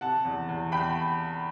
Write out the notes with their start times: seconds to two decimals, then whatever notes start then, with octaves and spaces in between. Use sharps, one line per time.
0.01 C3 F#5 A5
0.25 E2
0.49 E2
0.72 E2 G5 B5